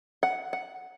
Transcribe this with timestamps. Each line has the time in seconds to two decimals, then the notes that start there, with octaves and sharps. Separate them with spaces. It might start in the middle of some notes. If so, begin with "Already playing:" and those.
0.23 F#5
0.53 F#5